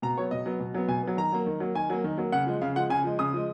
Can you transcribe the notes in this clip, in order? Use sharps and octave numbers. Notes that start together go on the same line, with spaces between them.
B2 A#5
F#3 B3 C#5
B2 D#5
F#3 B3
B2
F#3 B3
B2 G#5
F#3 B3
D#3 A#5
F#3 A#3
D#3
F#3 A#3
D#3 G#5
F#3 A#3
D#3
F#3 A#3
C#3 F#5
F3 G#3
C#3 F5
F3 G#3 F#5
C#3 G#5
F3 G#3
C#3 D#6
F3 G#3